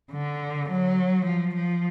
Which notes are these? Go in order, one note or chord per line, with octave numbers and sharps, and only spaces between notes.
D3
F#3
F3
F3